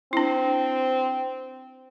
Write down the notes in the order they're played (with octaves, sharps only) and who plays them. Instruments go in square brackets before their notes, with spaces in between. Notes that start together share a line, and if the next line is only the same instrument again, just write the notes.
[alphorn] C4 [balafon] D4 E4